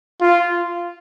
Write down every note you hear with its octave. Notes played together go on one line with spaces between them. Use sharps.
F4